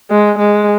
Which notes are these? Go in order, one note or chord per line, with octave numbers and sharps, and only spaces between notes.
G#3
G#3